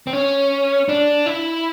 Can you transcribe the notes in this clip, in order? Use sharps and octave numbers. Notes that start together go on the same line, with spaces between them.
C4
C#4
D4
E4